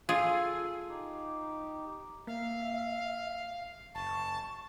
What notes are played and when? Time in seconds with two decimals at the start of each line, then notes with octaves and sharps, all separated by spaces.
0.09 F4 G#4 A4 F5 G#5
0.89 D#4 G4
2.27 A#3 E5 F5
3.95 F#1 A5 C#6